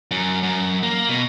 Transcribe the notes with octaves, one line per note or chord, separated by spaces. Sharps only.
F#2
F#2
A#3
B2